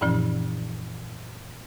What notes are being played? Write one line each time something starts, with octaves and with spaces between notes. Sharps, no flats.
F#2 A#2 E3 F3 C#4